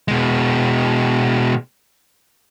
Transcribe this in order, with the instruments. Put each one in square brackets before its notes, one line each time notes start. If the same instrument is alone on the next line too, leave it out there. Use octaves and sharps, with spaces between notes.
[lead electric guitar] B2 G#3